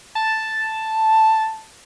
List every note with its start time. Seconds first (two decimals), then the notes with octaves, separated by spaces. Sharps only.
0.15 A5